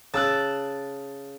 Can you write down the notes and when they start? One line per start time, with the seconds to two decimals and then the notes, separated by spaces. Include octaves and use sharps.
0.14 C#3 A5 E6 F#6